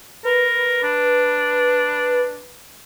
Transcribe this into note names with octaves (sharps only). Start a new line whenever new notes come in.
A#4 B4
D4